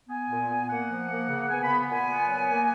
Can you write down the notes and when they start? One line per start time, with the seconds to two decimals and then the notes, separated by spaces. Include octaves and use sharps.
0.08 B3 G#5
0.28 A#2
0.48 B3
0.68 A#3 F#5
0.89 F3
1.09 A#3
1.28 C#3
1.48 B3 G#5
1.62 B5
1.68 B3
1.88 A#2 G#5
2.09 B3
2.28 F#3
2.49 A#3